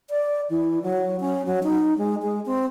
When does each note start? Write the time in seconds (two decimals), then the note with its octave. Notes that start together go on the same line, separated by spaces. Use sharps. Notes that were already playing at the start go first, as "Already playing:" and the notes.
0.10 D5
0.50 E3
0.83 F#3
1.20 C#4
1.46 F#3
1.63 D#4
1.98 G#3
2.22 G#3
2.46 C4